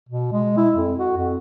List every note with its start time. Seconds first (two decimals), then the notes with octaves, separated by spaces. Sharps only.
0.09 B2
0.33 G#3
0.57 E4
0.75 F2
0.99 F#4
1.18 F2